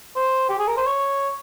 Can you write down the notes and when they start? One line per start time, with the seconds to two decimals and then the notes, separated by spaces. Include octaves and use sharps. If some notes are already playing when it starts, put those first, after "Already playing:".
0.16 C5
0.49 G4
0.59 G#4
0.68 A#4
0.77 C5
0.86 C#5